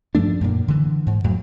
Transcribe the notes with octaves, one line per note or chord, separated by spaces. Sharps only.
G2 F3 A3 D4
F#2 A#2
D3 E3
G#2
F2 A2 F#3